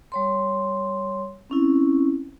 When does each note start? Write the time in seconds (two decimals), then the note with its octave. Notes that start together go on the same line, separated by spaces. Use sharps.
0.12 G3 C#5 C6
1.50 C4 C#4 E4